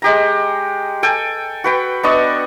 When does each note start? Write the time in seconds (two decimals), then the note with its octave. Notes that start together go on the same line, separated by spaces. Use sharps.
0.02 G#3 G4 A#5
1.03 A4 G5 G#5
1.64 F#4 B4 G5
2.03 B3 D4 D#5 C#6